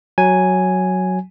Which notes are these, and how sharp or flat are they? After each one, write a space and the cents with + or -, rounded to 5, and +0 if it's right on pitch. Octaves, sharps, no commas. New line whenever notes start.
F#3 +0 G#5 +0